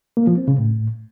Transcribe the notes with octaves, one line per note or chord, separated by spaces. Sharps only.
A#3
F3
C4
C#3
A2